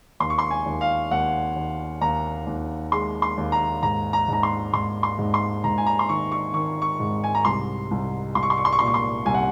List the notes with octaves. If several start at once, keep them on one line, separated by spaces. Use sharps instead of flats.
D#2 C6
C#6
C6
G#5
D#2
F5
D#2 F#5
D#2
D#2 A#5
D#2
G#3 C6
C6
D#2
A#5
G#2 A#5
A#5
G#2 A#5
C6
G#2 C6
C6
G#2
C6
G#2 A#5
G#5
A#5
C6
D#3 C#6
C#6
D#3 C#6
C#6
G#2
G#5
A#5
C2 C6
C2
C2 C6
C#6
C6
C#6
C6
C#6
A#2 C6
C#6
C6
C2 G#5
F#5